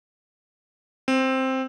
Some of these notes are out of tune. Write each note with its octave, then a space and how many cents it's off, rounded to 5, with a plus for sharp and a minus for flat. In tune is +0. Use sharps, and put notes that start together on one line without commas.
C4 +5